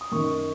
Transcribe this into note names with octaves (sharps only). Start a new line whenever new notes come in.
D#6
F#2 D#3 C#6